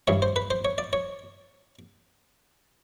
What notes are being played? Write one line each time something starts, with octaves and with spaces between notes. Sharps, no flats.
G2 E3 C#5
C5
B4
C5
C#5
D5
C#5